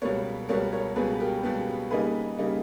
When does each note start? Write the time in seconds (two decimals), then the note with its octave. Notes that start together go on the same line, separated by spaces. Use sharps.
0.02 C#2 B2 G3 B3 A#4 C#5
0.49 C#2 B2 G3 B3 A#4 C#5
0.73 A#4 C#5
0.96 C#2 B2 G3 B3 G#4 B4
1.20 G4 A#4
1.44 C#2 B2 G3 B3
1.91 C#3 G3 A#3 D#4 G#4 B4
2.38 C#3 G3 A#3 D#4